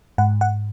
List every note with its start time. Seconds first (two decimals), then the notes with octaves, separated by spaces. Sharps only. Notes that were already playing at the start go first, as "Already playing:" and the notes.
0.18 G#2 F#5
0.41 F#5